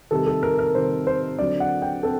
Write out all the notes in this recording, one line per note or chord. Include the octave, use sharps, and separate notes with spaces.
C3 D#3 G3 A4
A4
A#4
A#4
C3 D#3 G3 C5
C5
D3 F#3 C4 D5
F#5
G5
C4 A4